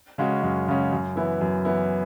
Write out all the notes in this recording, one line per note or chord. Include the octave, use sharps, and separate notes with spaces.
C#3 G#3 C#4 F#4
F#2
C#3 G#3 C#4 F#4
F#2
E3 B3 E4
F#2
E3 B3 E4